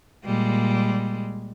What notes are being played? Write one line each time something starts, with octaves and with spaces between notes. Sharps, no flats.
A#2 G3 G#3